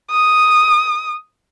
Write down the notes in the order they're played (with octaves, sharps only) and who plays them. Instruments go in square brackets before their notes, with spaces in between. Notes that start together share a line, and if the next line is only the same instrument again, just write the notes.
[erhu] D#6